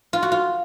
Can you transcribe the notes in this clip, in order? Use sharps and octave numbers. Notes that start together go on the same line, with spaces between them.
F4
F#4
F4